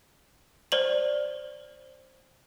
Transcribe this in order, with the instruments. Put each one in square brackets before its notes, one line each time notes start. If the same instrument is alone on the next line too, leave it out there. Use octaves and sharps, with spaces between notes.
[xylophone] C5 D5 F#7